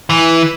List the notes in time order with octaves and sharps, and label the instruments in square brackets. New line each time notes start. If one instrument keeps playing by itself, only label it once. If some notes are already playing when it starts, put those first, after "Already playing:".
[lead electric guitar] E3